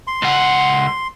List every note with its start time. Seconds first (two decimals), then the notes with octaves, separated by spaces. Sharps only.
0.07 C6
0.22 C#2 F#5